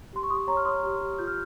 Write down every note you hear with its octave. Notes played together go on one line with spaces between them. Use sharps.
G4 C6
C#6
G4 C6 D#6
C#5 A#5 C#6
F6
C#5 C6 D#6
G4
G4
F4 G6
F6